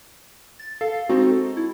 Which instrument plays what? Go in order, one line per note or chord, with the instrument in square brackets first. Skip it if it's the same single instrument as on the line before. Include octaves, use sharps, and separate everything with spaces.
[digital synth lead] A6
[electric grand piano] A4 [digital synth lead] F5
[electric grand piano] G#3 C4 D#4 [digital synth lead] F#4
[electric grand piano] A4
[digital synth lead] E4